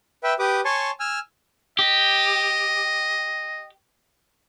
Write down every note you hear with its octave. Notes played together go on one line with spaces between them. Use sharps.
B4 E5 G5
G4 B4 D6 D#6
C#5 G#5 A5 C6 C#6
G#5 E6 F6
G4 D#5